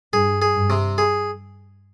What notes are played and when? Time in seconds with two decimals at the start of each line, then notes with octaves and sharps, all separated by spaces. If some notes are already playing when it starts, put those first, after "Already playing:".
0.13 G2 G#4
0.42 G#4
0.56 G2
0.70 C3
0.98 G#4